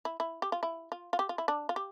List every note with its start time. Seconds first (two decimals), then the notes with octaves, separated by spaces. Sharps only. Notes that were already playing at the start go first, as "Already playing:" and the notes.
0.05 E4
0.20 E4
0.42 G4
0.52 F4
0.63 E4
0.92 F4
1.13 F4
1.19 G4
1.29 F4
1.38 E4
1.48 D4
1.69 F4
1.76 G4